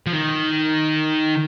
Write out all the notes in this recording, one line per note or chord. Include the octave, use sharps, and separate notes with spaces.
F3
D#3